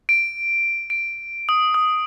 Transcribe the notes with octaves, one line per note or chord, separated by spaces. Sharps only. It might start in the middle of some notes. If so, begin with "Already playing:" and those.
D7
D7
D#6
D#6